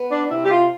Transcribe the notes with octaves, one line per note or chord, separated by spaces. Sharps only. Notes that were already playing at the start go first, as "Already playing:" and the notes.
Already playing: B3
D4
D4
C3 E4
G4
F4